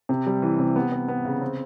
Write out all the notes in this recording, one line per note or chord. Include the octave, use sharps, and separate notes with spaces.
C3
G3
E3
C3
B3
B3
B3
C#3
C4